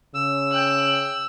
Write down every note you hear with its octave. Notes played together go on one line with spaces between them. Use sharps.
C#3 E6
G5 F#6